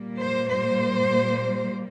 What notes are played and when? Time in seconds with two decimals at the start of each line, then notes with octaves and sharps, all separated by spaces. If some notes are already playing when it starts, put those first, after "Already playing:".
Already playing: A#2 G3 A#3
0.19 C5
0.48 C5